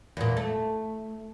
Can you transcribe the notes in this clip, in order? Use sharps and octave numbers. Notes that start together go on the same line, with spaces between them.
E2 A#2
A3